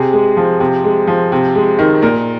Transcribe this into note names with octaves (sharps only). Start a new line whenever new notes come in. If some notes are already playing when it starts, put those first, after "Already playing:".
Already playing: C3 G#4
G#3
F3
C3
G#3
F3
C3
G#3
D#3
A#2 A#4